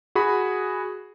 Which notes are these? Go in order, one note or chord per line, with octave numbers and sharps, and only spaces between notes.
F#4 G#4 B5